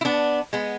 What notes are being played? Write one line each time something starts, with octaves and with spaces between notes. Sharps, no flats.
E4
B3 D4
G#3 B3